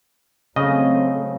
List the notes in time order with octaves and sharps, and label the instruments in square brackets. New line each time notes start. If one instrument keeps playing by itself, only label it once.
[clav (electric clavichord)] C#3 D#5 [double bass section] F#3 A3 C4